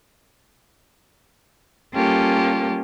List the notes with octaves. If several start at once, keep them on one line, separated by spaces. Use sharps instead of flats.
G3 A#3 C#4 F4 G4 A4